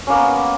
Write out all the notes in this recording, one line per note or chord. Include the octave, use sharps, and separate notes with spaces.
A#3 B3 C#4